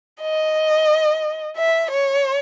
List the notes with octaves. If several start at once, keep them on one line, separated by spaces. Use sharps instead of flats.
D#5
E5
C#5